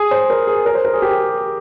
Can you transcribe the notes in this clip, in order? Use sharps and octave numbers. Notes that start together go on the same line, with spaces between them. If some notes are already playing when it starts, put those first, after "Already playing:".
Already playing: G#4
C5
A#4
G#4
A#4
C5
A#4
G#4
G4